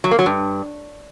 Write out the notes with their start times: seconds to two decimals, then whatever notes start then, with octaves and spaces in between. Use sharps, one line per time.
0.04 F#3
0.11 A#3
0.19 F#3
0.26 G2